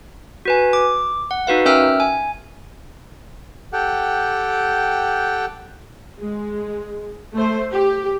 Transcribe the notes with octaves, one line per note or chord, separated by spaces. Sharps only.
F#4 B4 G#5
D6
F#5
D#4 F#4 B4 F5
C#4 A#4 E5 G5 E6 F6
G#5
G4 A4 F#5 G5
G#3
A3 C5
G4